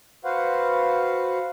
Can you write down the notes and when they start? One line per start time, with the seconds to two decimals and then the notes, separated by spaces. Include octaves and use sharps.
0.24 F#4 B4 C5 F5 F#5